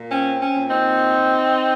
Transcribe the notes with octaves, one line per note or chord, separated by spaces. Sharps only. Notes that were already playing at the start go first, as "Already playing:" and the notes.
Already playing: A#2
C4 C#4
C#4
A#2
C4 D#4